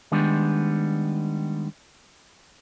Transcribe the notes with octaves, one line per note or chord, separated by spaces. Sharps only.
D#3 G3 G#3 B3 D4